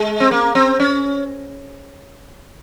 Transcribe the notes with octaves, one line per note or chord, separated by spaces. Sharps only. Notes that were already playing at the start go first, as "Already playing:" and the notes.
Already playing: G#3
C4
A#3
C4
C#4